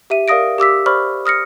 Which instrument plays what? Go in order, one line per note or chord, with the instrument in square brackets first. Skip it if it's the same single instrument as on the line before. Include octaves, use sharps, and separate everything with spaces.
[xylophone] G4 E5 D#7
A#4 D5 F5 D#6 A#6 D7
G4 D6 E6 B6
C5 D5 B5 C#6 F6
D#6 F6 A#6 C#7